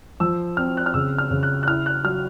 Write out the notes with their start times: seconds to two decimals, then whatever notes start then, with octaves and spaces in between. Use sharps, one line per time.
0.20 F3 E6
0.57 C4 F6
0.77 F#6
0.86 F6
0.94 C#3 E6
1.18 F6
1.31 C#3
1.43 F#6
1.63 F#6
1.67 E4 F6
1.86 F#6
2.04 F#3 F6